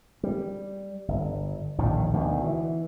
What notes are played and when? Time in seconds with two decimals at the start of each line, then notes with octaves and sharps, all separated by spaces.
0.23 G3
1.08 G1
1.79 A#1 D#2 A2 D#3
2.13 D2 B2 D#3
2.44 E3